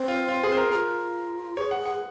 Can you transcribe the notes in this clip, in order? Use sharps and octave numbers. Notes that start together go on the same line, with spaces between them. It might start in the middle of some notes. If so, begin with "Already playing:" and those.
Already playing: C4
F4
F4
G#4
C5
A#4
F4 G#4 A#4
G#4 C#5
F#5
F#5